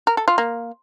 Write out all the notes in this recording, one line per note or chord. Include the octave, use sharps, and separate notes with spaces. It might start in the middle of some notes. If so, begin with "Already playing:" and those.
A#4
A4
F4
A#3